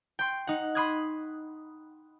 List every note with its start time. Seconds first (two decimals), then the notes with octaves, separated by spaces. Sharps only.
0.19 G5 C6
0.47 D#4 F#5
0.75 B5 C6 D#6 F#6 G#6